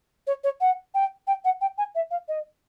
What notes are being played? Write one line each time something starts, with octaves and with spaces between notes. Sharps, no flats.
C#5
C#5
F#5
G5
G5
F#5
G5
G#5
E5
F5
D#5